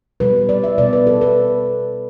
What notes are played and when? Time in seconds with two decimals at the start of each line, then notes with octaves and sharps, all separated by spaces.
0.20 B2 G3 B4
0.49 D5
0.64 E5
0.78 B2 G3 D5
0.93 B4
1.07 A4
1.21 B4